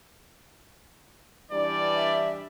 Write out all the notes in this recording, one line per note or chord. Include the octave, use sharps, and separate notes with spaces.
E3 G3 D4 D5
E5